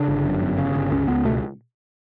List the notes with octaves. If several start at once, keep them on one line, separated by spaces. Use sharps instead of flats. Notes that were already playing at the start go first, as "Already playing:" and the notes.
Already playing: C#3 D4
G1
F#2
G1
C#3
G1
C#2 C#4
C#2 B3
B2 A3